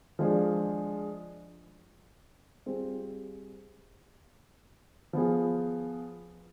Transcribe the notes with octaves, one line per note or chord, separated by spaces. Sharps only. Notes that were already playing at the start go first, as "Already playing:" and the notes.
F3 G#3 D4 F4 G#4
G3 C4 F4 G#4
F3 B3 F4 G#4